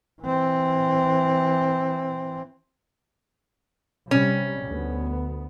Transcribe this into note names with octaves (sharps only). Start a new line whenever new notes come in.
E3 C4
C3 G3 C#4
D2 B3